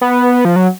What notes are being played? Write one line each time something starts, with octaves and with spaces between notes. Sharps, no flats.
B3
F3
F#3